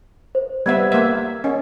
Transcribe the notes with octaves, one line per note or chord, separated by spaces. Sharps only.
C5
G3 B3 E5 G#6
A#3 E5
C#4 A#4 D#5